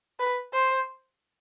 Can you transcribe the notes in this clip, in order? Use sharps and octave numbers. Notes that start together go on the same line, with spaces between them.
B4
C5